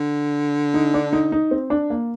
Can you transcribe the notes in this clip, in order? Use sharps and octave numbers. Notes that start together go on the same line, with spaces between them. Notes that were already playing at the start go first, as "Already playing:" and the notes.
Already playing: D3
D#4
D4
D#4
D#4
C4
D4
A#3